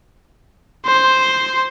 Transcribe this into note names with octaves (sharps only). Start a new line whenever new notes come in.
C5